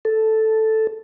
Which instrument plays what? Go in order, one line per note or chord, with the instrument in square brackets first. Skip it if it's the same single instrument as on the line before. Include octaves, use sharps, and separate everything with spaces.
[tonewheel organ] A4